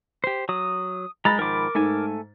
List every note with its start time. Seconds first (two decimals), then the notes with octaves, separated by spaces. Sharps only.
0.24 G4 C5
0.49 F#3 D#6
1.25 G#3 A#5 B5 A6
1.39 G#2 D#3 F3 A#4 D6
1.75 G#2 A3 A4 G#5